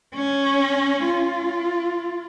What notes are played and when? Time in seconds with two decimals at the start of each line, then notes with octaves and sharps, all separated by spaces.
0.15 C#4
1.05 F4